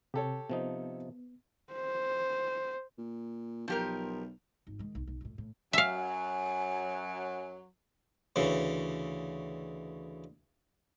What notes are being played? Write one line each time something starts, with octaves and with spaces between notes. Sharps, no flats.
C3 G4 A4 C#5
C3 F3 B3 D#4
C5
A#2
B1 F3 G4 A#4
G#1
D#3 G#3
B1
B1
F2 A2
A2
F#2 F#3 E5 F5 G#5
D2 C#3 E3